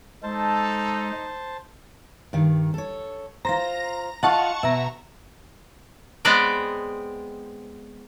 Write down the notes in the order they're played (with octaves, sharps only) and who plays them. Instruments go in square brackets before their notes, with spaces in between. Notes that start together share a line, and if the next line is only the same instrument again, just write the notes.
[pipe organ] G#3 [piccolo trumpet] D#4 [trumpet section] A4 [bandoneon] C5 A5
[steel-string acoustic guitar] G2 D#3
A4 C#5
[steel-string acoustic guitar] F4 C5 [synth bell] A#5 A#6
[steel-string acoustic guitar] F4 D#5 F5 [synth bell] F#5 A5 C#6
[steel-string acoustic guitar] B2 [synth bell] E5 A#5
[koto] G#3 B3 C4 B4 D5